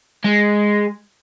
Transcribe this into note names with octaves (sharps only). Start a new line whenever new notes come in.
G#3